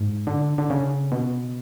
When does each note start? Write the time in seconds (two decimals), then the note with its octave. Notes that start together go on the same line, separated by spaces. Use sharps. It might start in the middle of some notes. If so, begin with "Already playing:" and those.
Already playing: G#2
0.27 D3
0.58 D3
0.70 C#3
1.12 B2